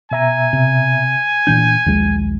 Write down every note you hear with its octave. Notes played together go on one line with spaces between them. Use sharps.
B2 E5 G#5 A#5
C3
A#2 E3 D4 G6
A#1 D#2 G#3